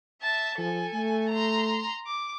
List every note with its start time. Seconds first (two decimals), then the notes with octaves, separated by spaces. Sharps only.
0.22 E5 A5
0.58 F3 A4 G#5
0.94 A3
1.29 A#5 C6
2.07 D6